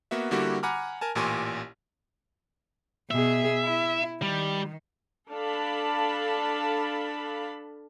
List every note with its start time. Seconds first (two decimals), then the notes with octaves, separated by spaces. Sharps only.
0.11 A#3 B3 F#4 E5
0.31 D3 G3 A#3 E4 F#4 G4
0.63 F#5 G#5 A#5 B5 D6 F6
1.01 A#4 G#5 A5
1.15 A1 A#2 G4 G#5 C6 C#6
3.11 B2 G#4 E5
3.64 E4
4.22 D#3 G3
5.31 D4 A4 F5 A5 B5